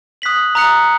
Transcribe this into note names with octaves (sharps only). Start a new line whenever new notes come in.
D#6 F#6 B6 F#7
A#5 D#6 F#6 C#7